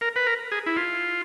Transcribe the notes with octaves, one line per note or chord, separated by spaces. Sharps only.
A#4
B4
A#4
G#4
E4
F4